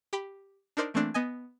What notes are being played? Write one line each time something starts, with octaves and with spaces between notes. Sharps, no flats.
G4 G5 B5
D4 D#4 A#4 C5 D5
E3 A3 A#3 C4 D4
B3 D#5 G#5